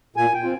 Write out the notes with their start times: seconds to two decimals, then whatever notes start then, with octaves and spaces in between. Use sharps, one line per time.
0.16 A#2 G#5
0.34 G5
0.43 C4 F4